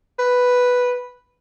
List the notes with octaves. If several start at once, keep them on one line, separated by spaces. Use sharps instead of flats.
B4